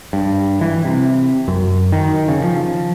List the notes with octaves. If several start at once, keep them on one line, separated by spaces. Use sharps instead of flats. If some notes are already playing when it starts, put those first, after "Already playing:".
G2
E3
C3
F#2
D#3
C#3
F3